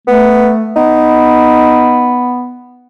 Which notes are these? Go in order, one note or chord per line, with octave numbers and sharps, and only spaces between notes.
A3 B3
B3 D#4